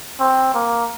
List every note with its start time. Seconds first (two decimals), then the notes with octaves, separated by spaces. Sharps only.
0.20 C4
0.54 A#3